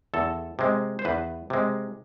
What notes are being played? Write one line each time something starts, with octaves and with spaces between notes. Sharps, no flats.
E2 A4
C3 G#3
C5
E2 B4
C3 G#3